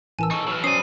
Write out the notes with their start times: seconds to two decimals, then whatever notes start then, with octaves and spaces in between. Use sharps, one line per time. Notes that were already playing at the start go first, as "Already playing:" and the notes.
0.19 A1 E3 A#4 G#5 A5 E6
0.31 D#4 A4 C#6 E6
0.48 F#3 B4 E6 F6
0.64 C#4 C5 D5 D#6 C7 D#7